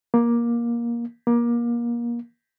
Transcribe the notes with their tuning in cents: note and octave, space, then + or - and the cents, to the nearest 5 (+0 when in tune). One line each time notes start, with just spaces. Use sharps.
A#3 +15
A#3 +25